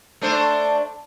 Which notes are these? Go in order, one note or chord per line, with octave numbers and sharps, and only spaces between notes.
A3 D4 C5